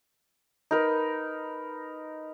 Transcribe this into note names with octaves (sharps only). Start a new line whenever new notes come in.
D#4 A#4 B4